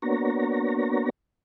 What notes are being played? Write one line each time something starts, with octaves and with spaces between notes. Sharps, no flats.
A#3 B3 D4 F#4 C#5 A#5